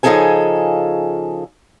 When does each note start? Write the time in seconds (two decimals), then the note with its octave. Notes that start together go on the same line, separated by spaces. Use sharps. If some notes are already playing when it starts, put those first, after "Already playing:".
0.03 C#3 F3 D#4 G#4 A4 G#5